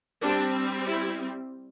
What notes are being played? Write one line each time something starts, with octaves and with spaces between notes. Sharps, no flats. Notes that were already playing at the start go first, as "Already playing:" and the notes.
G3 C4 D4
E4